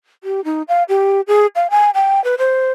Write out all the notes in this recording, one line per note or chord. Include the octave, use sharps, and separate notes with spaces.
G4
D#4
F5
G4
G#4
F5
G#5
G5
B4
C5